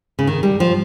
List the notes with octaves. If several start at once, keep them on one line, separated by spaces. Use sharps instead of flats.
C#3
D#3
G3
F3